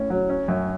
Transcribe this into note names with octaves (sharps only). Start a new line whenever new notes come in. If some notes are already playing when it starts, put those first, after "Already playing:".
Already playing: A2 C#4
F#3
C#4
F#2